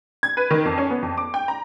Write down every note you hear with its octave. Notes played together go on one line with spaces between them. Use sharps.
G#6
B4
D#3
F2
C#4
B3
F2
D6
G5
A#5